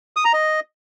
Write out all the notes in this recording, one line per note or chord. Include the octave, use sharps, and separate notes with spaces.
D#6
A#5
D#5